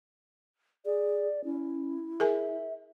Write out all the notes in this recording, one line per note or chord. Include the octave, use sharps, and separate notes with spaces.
G#4 D5
C#4 E4
G#4 A#4 E5 G#5